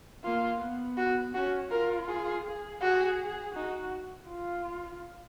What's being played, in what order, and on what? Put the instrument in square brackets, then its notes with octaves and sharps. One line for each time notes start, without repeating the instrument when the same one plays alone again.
[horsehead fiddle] A#3 [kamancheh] F4
[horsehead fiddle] B3
[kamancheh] F#4
[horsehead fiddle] C#4 [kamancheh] F#4
[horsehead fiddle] F4 [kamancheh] A#4
[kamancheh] G#4
[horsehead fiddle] G#4
[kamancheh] F#4 [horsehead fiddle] G#4
[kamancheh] D#4 [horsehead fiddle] F#4
[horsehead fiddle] F4